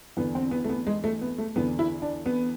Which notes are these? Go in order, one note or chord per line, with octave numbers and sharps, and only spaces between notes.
E2 D3 B3
C4
B3
A3
B3
G#3
A3
B3
A3
E2 D3 B3
E4
D4
B3